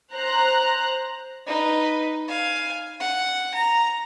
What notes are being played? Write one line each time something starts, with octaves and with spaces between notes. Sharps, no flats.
C5 A#5 F#6
D#4 B4
F5 G#5
F#5
A#5